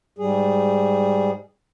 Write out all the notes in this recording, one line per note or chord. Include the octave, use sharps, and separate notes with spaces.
G#2 G3 G#4